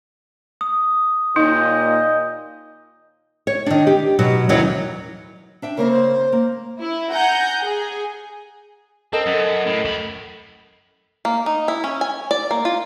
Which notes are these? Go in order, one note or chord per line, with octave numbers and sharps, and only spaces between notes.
D#6
D#2 A#2 D#4 D#5 G6
C#5
D#3 D4
G4
B2 F#3
D#2 D#3 E3 F#3 C#4 C#5
D4 E5 G5
C#3 A#3 C4 A#4
C5
A#3
E4
F#5 G#5 A#5 G6
G#4
C4 A4 A#4 D#5
F#2
A2
F#2 B5
A#3
D#4
E4
C#4
G#5
D5
A#3
F4